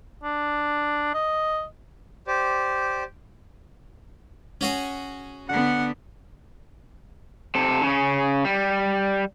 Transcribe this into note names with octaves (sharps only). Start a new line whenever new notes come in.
D4
D#5
G4 C5 D5
C#4 F#4 G#4
D3 B3 F#5
C3 A4
C#3 C#4
G3